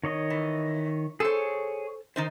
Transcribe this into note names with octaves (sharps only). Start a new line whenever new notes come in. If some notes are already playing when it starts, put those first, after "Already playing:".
D#3 C#5 D#5
E3
G#4 A4 C5 C#5
D#3 D#4 C5